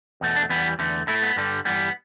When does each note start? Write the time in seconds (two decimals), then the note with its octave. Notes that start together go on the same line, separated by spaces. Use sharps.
0.21 E2 B2 A3
0.36 D4
0.49 E2 E3 G3 B3
0.79 E2 D3 A3
1.07 A2 A3 E4
1.22 B3
1.36 G2 D3 G3
1.65 G2 E3 G3 B3